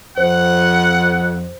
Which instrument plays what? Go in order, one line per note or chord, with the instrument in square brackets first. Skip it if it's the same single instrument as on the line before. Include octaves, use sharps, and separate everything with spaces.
[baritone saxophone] F2 [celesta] C5 [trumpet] F#5